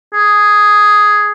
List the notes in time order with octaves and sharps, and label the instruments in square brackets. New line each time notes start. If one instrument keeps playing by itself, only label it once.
[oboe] G#4